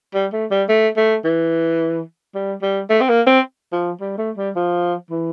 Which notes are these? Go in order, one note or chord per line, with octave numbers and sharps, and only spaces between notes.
G3
A3
G3
A3
A3
E3
G3
G3
A3
C4
A#3
C4
F3
G3
A3
G3
F3
E3